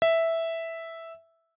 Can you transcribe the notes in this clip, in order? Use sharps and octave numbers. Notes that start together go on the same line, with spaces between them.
E5